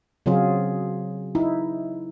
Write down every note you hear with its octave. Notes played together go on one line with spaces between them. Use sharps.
C#3 F#3 C4 F4 G#4
D#4 E4